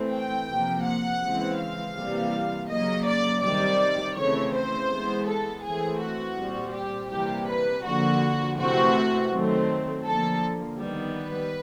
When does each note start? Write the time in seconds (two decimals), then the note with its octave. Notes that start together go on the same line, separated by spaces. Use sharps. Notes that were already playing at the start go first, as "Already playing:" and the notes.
Already playing: E3 A3 C4
0.12 G5
0.48 C3 F3 A#3
0.85 F#5
1.22 C#3 E3 G#3 C4
1.59 F5
1.95 C3 E3 G3 A#3
2.69 C#3 F#3 A#3 D#5
3.06 D5
3.42 C3 D#3 G3 D5
4.16 C#3 E3 A3 C4 C#5
4.53 C5
4.90 E3 G#3 B3
5.27 A4
5.63 E3 A3 C4 G#4
6.01 F#4
6.37 A#2 G3 C4
6.73 G4
7.10 C3 E3 G3 A#3 G4
7.48 B4
7.84 D3 F3 A#3 F#4
8.58 C3 E3 A3 C4 F#4
9.32 D#3 F#3 A3 C4
10.04 D3 F3 A#3 A4
10.79 D#3 G3 B3
11.15 B4